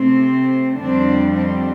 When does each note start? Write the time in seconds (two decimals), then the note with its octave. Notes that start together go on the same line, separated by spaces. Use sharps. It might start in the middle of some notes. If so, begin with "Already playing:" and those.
Already playing: C3 A3 C4
0.77 F2 D3 G3 C4 D4
1.35 C4